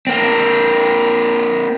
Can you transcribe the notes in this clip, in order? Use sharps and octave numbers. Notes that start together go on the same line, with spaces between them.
A#3 C4